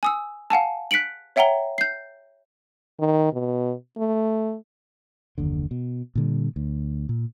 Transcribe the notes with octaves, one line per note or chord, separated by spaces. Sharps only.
G#5 D#6 E6
F5 F#5 G#5 A5
F#6 B6 C#7 D7 F#7
C#5 E5 F#5 G5 A#5 G7
G6 C7
D#3
B2
A3
F#1 D#2 D3
B2
A#2 D3 G3
D2
A#2